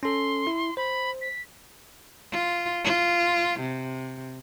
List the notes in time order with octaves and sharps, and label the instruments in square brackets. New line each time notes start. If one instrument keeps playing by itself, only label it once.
[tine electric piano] C#4 A4 [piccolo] C6
[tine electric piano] E4
[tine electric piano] C5 [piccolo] B5
[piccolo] B6
[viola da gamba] F4
F4
C3